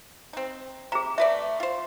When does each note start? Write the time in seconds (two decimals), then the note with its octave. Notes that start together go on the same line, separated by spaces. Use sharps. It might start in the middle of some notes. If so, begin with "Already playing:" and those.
0.33 C4 D#4
0.92 C3 G#4 A#5
1.18 A3 B4 D5 E5
1.60 F4 C5